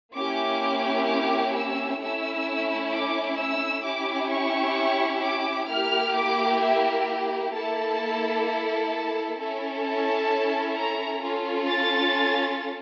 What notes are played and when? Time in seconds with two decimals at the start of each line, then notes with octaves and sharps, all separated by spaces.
0.15 A#3 C#4 E4 G4 D6
1.08 D6
1.54 E6
2.00 A3 C#4 E4 E6
2.91 D6
3.38 E6
3.84 C#4 E4 G4 D6
4.30 C#6
5.22 D6
5.68 A#3 E4 G4 F6
6.15 D6
6.61 E5
7.53 A#3 E4 A4 A5
8.45 A5
9.37 C#4 E4 A4
9.84 A5
10.76 A#5
11.22 C#4 F4 A4
11.68 A6